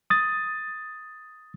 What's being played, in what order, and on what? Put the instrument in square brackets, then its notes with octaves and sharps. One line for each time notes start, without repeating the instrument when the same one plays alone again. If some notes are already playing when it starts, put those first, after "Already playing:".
[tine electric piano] D#6 A6